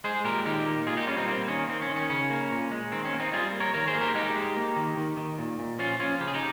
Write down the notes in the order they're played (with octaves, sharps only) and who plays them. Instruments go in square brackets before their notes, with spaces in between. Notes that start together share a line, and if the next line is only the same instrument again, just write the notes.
[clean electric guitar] G#3 G#4 C5
A#2 G4 A#4
D#3 D#4 G4
A#3
A#2 F4 G#4
D#4 G4
G3 C#4 F4
C4 D#4
A#3 C4
D#3 C#4
D#3 C4
C#4
D#3
C#4
C#3 C#4
A#3
A#2
G#3
D#3 C4
C#4
A#3
C4 D#4
G3 F4 G#4
A#3
A#4 C#5
D#3 A#4 C#5
G#4 C5
A#3
G4 A#4
G#3 D#4 G4
G#3
A#3
D#3
D#3
D#3
A#2
A#2
F3 C#4 F4
F3 C#4 F4
C#3 G4
G#4
D#4 G4